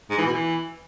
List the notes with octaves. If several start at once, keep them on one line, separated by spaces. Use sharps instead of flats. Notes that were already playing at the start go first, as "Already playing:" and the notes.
G#2
E3
B2
E3